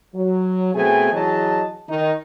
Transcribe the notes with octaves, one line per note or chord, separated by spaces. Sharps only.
F#3
B2 A3 B3 C4 G#4 G#5
E3 F#3 G#4 D#5 A5
D#3 D#4